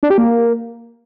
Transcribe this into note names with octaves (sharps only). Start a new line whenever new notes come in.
D4
G4
A#3